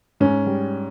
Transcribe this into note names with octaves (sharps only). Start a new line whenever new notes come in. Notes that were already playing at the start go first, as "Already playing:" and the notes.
G#2 C#4
G3